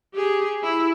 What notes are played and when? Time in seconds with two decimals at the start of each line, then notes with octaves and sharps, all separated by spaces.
0.14 G4 G#4
0.63 E4